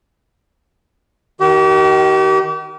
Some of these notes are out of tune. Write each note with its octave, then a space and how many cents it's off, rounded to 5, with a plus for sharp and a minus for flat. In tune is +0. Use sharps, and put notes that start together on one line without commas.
D#3 +5 G4 -40